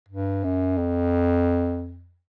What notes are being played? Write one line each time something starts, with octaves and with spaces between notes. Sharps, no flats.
G2
F#2
F2